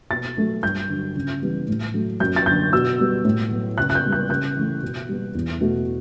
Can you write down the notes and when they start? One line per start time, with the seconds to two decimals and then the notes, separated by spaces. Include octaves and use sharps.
0.10 B2 A6
0.37 F#3 A3
0.63 G2 G6
0.89 D3 F#3
1.16 C#3
1.42 E3 G3 B3
1.68 A2
1.94 F#3 A3
2.20 F#2 G6
2.36 A6
2.46 D3 F#3 G6
2.73 B2 E6
2.99 G3 B3
3.25 A2
3.51 F#3 B3
3.78 C#3 F#6
3.90 F#6
3.95 G6
4.04 G3 B3
4.12 F#6
4.30 C#3 G6
4.56 E3 A3
4.82 B2
5.09 G3 B3
5.35 E2
5.61 B2 A3